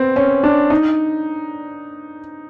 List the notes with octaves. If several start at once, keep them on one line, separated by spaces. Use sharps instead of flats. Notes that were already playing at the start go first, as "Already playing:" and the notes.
Already playing: B3 C4
C#4
D4
D#4